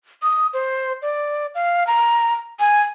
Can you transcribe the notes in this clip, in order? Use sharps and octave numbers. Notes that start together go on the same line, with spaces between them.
D#6
C5
D5
F5
A#5
G#5